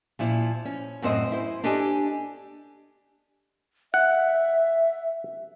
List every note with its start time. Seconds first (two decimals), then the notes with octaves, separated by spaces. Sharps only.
0.19 A#2 F3 E4
0.65 C#4
1.02 F#2 A2 C4 C5 D#5
1.32 E4 C5
1.64 D4 G4 A4 D#5 G#5
3.94 E5 F#5